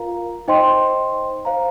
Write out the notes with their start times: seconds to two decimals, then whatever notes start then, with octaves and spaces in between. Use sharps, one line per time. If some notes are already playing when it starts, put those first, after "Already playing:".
Already playing: F4 A#4 F5 A#5
0.48 D#4 C5 D#5 G5 C6
1.45 C5 F5 A#5